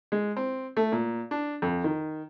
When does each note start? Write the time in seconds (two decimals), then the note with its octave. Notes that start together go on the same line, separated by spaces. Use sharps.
0.12 G#3
0.36 C4
0.77 A3
0.92 A#2
1.31 D4
1.62 F2
1.84 D#3